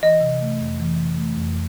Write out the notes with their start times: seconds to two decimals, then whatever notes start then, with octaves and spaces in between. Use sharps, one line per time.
0.02 E3 D#5
0.21 C3
0.41 A3
0.60 F2
0.80 E3
0.99 C3
1.18 A3
1.37 F2